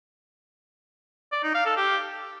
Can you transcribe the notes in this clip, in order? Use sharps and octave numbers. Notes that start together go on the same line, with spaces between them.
D5
D#4
F5
A4
G4